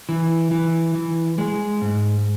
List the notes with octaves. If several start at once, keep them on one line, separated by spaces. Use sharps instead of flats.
E3
E3
E3
G#3
G#2